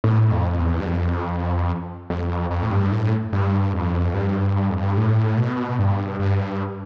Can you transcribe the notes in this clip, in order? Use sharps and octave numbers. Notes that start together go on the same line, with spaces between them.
A2
F2
E2
G2
F2
F2
F2
A2
G2
A2
G2
F2
G2
F2
G2
A2
B2
G2
G2